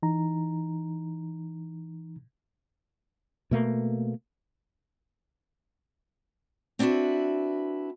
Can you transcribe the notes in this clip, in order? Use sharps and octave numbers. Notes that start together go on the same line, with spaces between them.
E3 D#4 A#5
B2 A3 A#3
C4 D4 E4 F#4 B4